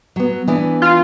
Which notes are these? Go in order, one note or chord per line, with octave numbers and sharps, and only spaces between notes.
F#3 B3
E3 B3 D4
F4